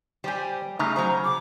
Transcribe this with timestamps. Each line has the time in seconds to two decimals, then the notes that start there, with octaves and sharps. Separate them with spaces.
0.24 G3 G4 C5 G5 G#5
0.79 C#3 A3 D#4 A#5
0.96 F#3 G#4 C5 A#5
1.24 D6